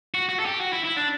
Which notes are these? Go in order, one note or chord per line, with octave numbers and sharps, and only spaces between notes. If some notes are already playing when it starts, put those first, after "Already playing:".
F#4
F#4
A4
G4
F#4
E4
E4
D4